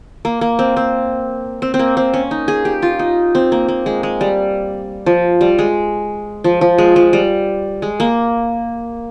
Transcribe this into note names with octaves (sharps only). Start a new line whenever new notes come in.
A#3
A#3
C4
C4
C4
C4
A#3
C4
C#4
D#4
G#4
G4
F4
D#4
C4
A#3
A#3
G#3
G#3
G3
F3
G3
G#3
F3
F3
G#3
F3
G3
G#3
A#3